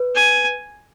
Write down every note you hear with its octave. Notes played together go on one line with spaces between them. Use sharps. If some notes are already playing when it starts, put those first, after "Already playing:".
Already playing: B4
G#5